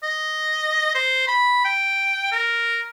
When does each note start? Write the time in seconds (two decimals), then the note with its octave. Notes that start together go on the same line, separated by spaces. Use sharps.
0.03 D#5
0.94 C5
1.28 B5
1.65 G5
2.32 A#4